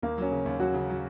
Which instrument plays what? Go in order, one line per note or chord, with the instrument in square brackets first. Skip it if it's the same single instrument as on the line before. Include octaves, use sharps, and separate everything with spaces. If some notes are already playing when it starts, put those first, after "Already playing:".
[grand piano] D#2 [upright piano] A#3
[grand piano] F#3 [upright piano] C#4
[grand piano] C#3
D#2
[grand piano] F#3 [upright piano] F#4
[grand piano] C#3
F#3